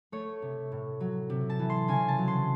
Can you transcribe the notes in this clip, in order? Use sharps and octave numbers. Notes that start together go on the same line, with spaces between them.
A3 C#5
C3
A2
F#3
C3
A5
E3
C6
C#3 G#5
A5
F#3
C6